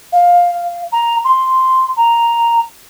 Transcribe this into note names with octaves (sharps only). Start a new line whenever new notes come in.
F5
A#5
C6
A#5